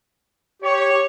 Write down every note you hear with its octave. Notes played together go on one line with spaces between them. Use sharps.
G4 C#5